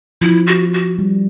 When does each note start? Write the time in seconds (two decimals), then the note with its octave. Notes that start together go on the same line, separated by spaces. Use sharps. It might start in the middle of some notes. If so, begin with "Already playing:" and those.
0.21 F3 E4
0.47 F#4
0.74 F#4
0.99 G3